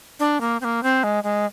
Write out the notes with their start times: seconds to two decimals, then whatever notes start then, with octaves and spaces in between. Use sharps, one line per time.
0.19 D4
0.41 A#3
0.61 C4
0.64 A#3
0.83 C4
1.04 G#3
1.24 G#3